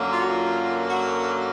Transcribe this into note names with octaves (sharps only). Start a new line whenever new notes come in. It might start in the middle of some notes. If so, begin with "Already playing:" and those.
Already playing: F#2 D3 F#3 A#3
F4
F#4
F4
F#4